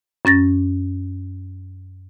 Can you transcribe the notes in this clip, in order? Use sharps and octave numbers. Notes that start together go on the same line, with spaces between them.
F#2 C#4 A6 A#6